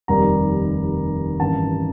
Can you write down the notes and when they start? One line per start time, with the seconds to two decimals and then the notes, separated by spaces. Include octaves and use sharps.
0.08 F1 D#2 D#3 G3 A#5
1.40 A1 G2 D#3 A5